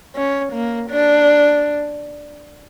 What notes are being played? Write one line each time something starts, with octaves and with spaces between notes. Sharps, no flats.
C#4
A#3
D4